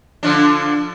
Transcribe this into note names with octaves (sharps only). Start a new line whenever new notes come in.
D3 F3 D4